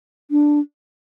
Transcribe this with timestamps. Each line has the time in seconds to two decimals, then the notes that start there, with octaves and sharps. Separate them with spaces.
0.31 D4